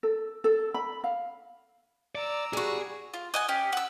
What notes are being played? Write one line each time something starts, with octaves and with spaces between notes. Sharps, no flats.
A4
A4
B5
F5
D5 A#5 E6
G3 F#4 G#4
F4
D#5 F#5 G#5
C#4 G4
F#5 E6